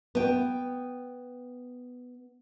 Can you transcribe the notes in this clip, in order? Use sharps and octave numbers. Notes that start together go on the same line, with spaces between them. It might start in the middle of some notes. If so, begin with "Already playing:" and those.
B3 G5